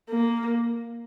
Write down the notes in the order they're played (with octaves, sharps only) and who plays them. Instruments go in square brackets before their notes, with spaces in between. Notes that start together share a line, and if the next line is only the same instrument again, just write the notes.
[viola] A#3